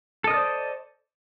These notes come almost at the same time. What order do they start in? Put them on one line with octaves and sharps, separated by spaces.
A4 D#5 A#4 D5 C5